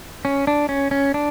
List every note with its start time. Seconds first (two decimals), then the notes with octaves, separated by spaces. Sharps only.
0.25 C#4
0.47 D4
0.69 C#4
0.91 C#4
1.14 D4